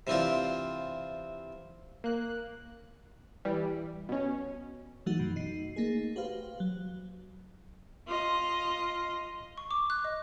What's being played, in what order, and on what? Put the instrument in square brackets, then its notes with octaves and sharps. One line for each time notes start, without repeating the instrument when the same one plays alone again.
[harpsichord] C3 E3 C4 D4 F4
[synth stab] A#3 F#6
E3 G3
B2 C#4
[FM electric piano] E3 F#3 A3 D#4 F#4
F#2 B2
D#4 C7
A3 A#3 D#4 G#4
F#4 G4 B4 C5 F5
F#3
[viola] F4 D#5
[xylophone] C#6
D6
F#6
D#5